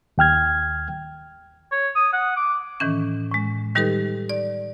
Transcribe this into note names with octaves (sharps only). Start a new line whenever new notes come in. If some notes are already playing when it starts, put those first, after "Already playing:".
D#2 G5 F6 G#6
C#5
D#6
F#5
D6
A2 D#3 E3 C#4
A2 G#3
D#3 G3 D#4 G4 A4 B4
D5